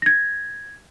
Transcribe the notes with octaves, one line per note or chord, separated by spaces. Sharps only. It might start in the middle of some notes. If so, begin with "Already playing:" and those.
G#6 A#6